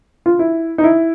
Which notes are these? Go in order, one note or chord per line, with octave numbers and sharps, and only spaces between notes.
F4
E4
D#4
E4